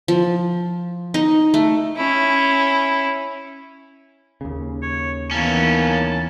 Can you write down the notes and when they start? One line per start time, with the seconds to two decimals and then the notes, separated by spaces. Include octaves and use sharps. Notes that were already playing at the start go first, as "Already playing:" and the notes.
0.08 F3
1.14 D#4
1.54 A3
1.97 C#4 E4
4.41 D#2 C#3
4.82 C#5
5.31 D#3 E3 A#3 B3 C#4 A5